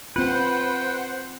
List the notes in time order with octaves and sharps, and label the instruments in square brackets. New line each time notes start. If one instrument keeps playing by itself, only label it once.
[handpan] C4 F4 [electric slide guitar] B4 [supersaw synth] C5 F#5 [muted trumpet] G5